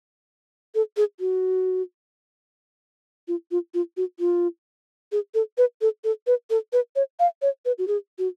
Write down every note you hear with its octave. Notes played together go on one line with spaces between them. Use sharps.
A4
G#4
F#4
F4
F4
F4
F#4
F4
G#4
A4
B4
A4
A4
B4
A4
B4
C#5
F5
C#5
B4
F#4
G#4
F#4